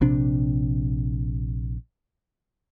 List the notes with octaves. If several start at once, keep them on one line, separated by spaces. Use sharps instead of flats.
A#1 C3 D4